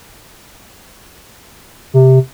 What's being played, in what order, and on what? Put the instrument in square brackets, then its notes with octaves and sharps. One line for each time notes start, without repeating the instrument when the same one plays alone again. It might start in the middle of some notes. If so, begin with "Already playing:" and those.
[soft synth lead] C3